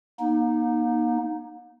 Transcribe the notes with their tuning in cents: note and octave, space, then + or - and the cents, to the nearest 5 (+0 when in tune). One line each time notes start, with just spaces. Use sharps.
A#3 +45 D#4 -5